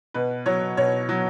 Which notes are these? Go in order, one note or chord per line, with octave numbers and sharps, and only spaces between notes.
B2 B4
F#3 C#5
B2 C#5
F#3